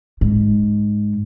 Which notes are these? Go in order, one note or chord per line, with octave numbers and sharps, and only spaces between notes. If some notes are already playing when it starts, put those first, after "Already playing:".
G#2